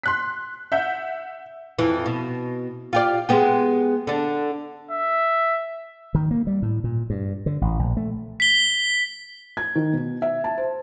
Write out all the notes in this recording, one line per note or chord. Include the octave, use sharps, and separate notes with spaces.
C6 F#6 B6
E5 F#5 G6
F2 E3
B2
F4 G4 D5
G#3 B3 G4
D3 D4
E5
D#3
A#3
G3
A2
A#2
G2
D3
A1
A#1
A3
B6 G7
G#6
D#3
B2
E5
A5
C5